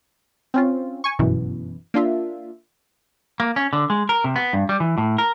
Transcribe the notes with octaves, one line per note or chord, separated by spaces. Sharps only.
C4 C#4 F4
G#5 C#6
G1 F#2 B2 E3
A#3 D4 F4 E5
A#3
C#4
D3
G#3
A#4
C3
B3
G2
G3
E3
A2
A#4